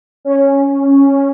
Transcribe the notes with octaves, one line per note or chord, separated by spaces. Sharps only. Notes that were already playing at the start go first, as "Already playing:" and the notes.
C#4